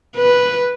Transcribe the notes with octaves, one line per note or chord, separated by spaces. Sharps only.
B4